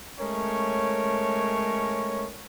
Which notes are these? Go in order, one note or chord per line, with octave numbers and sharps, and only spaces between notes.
G#3 A3 C#4 A#4 C#5